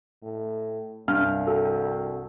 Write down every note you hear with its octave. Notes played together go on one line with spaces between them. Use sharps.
A2
C2 G2 F6
F#4 A4